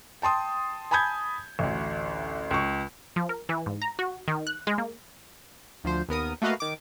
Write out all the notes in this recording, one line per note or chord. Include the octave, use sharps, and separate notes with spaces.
G5 A5 C6 D#6
G#5 A5 B5 D#6 G6 G#6
A1 D2
C#2 C#6
F3
A#4
E3
G#2
A#5
F#4
D#3
F#6
G#3
A#3
D2 F3 C5
D#2 B3 A#4 D#6
A3 A#3 F#4 B4 D#5 F5
D#3 D6